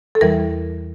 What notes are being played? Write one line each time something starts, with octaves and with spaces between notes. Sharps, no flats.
A4
E2 E3 G3 A#4